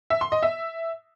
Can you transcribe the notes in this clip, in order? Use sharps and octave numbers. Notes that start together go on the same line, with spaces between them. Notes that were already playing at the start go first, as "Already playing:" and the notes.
E5
C6
D#5
E5